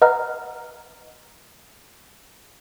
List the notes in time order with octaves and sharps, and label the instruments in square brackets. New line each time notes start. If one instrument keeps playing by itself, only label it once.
[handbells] B4 D#5 F#5 A#5 F6